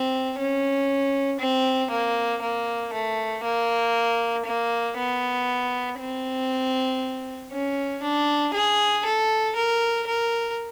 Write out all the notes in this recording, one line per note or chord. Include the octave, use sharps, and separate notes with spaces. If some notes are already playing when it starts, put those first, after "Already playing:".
Already playing: C4
C#4
C4
A#3
A#3
A3
A#3
A#3
B3
C4
C#4
D4
G#4
A4
A#4
A#4